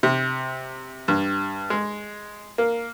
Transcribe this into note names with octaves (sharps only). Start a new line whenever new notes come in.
C3
G2
G#3
A#3